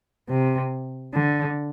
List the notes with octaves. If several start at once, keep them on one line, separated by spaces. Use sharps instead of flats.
C3
D3